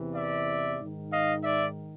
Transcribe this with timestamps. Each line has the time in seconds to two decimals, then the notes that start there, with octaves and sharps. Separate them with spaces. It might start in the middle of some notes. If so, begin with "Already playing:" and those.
Already playing: E2 C3 E3
0.15 D5 E5
0.79 G#2 D#3
1.11 D#5 F5
1.44 D5 E5